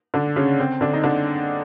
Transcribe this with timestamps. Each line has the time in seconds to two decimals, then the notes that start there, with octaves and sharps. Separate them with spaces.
0.14 D3 D4
0.36 C#3 C#4
0.60 C4
0.81 D3 D4
0.93 D#4
1.04 D3 D4